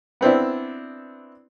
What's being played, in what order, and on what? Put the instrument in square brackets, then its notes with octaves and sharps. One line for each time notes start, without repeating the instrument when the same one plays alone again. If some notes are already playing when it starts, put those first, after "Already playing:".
[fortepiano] B3 C4 D4 E4